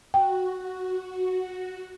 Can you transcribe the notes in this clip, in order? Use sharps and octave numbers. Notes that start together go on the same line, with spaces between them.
F#4 G5